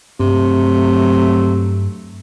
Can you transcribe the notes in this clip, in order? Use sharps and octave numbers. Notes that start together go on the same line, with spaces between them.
G2 C3 F#3 A3